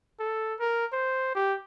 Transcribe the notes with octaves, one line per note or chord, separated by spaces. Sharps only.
A4
A#4
C5
G4